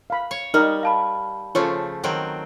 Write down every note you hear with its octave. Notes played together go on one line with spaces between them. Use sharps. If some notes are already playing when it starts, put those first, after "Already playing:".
F5 B5
C#5
G3 D#4 A#4 D#5 F6
F5 A5 B5
C#3 F3 A3 F4 C#5
D#3 F#3 C4